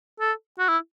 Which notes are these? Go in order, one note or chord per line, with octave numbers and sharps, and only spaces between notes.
A4
F#4
E4